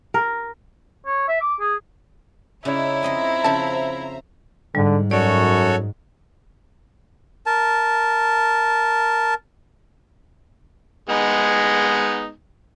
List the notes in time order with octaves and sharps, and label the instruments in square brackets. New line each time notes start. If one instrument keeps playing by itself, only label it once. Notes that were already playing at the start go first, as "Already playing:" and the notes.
[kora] A#4
[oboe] C#5
E5
D6
G#4
[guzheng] C#3 D#4 [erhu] E4 [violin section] C#5 D5 E5
[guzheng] F2 D#5 C6 [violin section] C5 E5 A#5
[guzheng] C#3 F3 [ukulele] A5
[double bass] G#2 [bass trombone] D3 [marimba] G3
[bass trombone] F#2 [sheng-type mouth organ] F#4 A4 C#5 [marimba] D5
[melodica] A#4 A5
[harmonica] G#3 B3 D#4